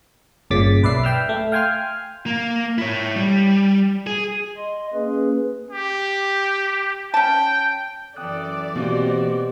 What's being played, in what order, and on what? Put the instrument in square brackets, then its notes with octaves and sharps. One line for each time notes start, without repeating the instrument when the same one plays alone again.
[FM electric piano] G1 A#2 C#3 D6 A6 B6
B1 B4 D5 E5 C7
E5 G5 E6 F6
A3
F5 G5 G#5 C6 F6
[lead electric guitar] A#3
E4 C#5
G3
G#4
[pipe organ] D#5 C6
A#3 C#4 G#4 B4
[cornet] G4
[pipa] C#4 A5 [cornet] G5
[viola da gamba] F#2 E3 A4 [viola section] D5 [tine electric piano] G5 D#6 F#6
[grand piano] B2 [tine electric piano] E3 A#3 C4 [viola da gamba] F#4 G4 C5